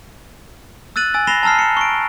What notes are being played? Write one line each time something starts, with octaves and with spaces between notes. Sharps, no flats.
E6 F#6 A6 D#7 F#7
G#5 E6 A6
B5 A#6 C7 E7 F7 G7
A5 A#5 E6 F6 C7
C#7 E7
C#6 D7